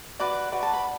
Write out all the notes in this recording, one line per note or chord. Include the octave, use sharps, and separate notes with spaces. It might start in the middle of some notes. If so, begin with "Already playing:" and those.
F#4 B4 D5 D6
F#4 B4 D5
A5
B5